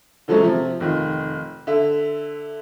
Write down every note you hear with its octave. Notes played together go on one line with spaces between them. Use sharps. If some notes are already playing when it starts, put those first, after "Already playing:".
D3 F3 F#3 G#3 A3 C#4
C3 F3
F1 D#3 F4
D3 E5